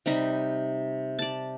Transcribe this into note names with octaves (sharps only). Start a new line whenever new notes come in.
C3 G3 D#4 B5
D5 A5